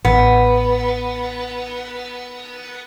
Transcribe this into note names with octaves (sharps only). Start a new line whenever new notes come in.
A1 B3